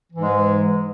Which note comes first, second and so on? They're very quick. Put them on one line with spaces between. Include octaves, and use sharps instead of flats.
E3 G#2 G#3